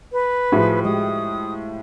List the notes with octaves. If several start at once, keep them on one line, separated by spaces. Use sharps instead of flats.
B4
A2 F3 F#4 G#4
G#3 G4 D#6